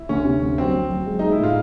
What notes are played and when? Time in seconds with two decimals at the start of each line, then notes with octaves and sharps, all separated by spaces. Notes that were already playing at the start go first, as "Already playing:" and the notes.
Already playing: E4
0.09 D2 C#4
0.25 C3
0.41 D2
0.58 F#3 C4
0.74 F#3
0.90 F#3
1.06 G#3
1.19 G#3 D#4
1.32 E4
1.39 A2 F4